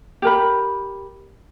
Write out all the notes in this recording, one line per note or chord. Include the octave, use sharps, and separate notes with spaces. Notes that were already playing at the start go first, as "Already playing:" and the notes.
G4 A#4 B5